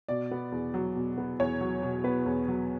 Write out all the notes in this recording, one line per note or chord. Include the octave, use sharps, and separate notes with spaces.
B2 D5
B3
E2
F#3
B2
B3
E2 C#5
F#3
B2
B3 B4
E2
F#3